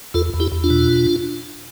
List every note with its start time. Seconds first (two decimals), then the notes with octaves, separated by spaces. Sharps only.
0.14 E2 F4 A4
0.34 E2
0.40 E4 G4
0.52 E2
0.64 D4 F4
0.70 B2